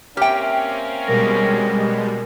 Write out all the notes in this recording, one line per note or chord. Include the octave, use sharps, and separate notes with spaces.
A#3 C4 C#4 G4 E5 G5 F6
B2 G3 G#3 A#4 A#6